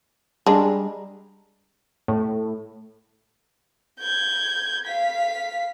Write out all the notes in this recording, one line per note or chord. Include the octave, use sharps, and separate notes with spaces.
G3 G#3 D4 A#5
A2
G6 G#6
F5 B6